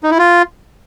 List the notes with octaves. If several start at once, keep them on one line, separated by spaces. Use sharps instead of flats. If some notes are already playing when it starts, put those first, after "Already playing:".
D#4
E4
F4